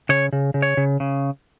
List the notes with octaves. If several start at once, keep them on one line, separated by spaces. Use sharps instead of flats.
C#3 C#5
C#3
C#3
C#5
C#3
C#3